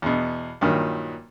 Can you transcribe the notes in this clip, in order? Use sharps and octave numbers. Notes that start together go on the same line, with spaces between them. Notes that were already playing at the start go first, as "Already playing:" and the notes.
E2 B2
G2 A#2 D#3 F#3